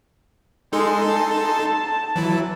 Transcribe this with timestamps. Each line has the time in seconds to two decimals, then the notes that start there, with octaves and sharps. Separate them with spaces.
0.73 G#3 D#4 A4 C6
1.06 A5
2.16 E3 F#3 E4